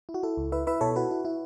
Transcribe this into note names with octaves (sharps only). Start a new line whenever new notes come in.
E4
F#4
E4 A4
C#2
E4 B4 E5
E4 B4 E5
B2 A4 C#5
E4 F#4 B4
E4
E4